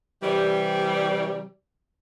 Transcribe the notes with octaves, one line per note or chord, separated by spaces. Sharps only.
C3 E3 G3